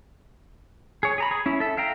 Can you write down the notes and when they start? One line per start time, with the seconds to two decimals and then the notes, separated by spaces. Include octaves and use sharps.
1.03 G#4 C#5
1.18 G#4 A#5 B5
1.31 G#4
1.46 C#4 E4
1.60 A4 E5
1.77 E5 F5 G5 A#5